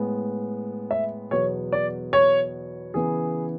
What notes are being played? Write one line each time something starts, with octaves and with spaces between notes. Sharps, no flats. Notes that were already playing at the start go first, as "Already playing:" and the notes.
Already playing: A2 G#3 B3
E5
E2 B2 F#3 B3 C#5
D5
C#5
C#3 E3 B3 G#4